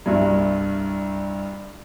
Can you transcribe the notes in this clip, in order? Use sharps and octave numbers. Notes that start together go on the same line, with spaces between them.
C2 G2